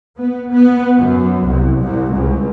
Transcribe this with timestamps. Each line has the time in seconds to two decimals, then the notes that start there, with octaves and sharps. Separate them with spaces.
0.18 B3
0.50 B3
0.99 F#2
1.45 C2
1.81 C2
2.14 C#2